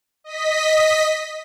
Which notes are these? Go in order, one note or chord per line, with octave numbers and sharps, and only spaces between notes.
D#5 B6